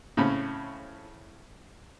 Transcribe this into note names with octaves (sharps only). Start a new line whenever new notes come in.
A2 C#3 C4 C#4 B5